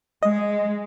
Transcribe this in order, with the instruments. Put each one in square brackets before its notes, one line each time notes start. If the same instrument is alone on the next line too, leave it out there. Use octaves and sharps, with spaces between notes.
[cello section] G#3 [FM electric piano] D#5